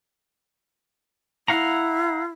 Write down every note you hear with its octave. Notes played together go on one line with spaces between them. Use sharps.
E4 F5 F#5 A#5